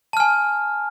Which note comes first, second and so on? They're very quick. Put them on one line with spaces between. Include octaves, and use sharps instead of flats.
A5 F6 G#5